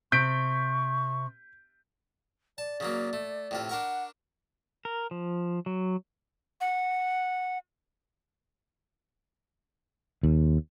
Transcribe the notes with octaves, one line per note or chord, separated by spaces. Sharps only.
C3 C#6 G6 B6 D7
D5 A5
C#3 F#3 A#3
A3
A2 C3 F4
D4 A#4 F#5 C#6
A#4
F3
F#3
F#5
D#2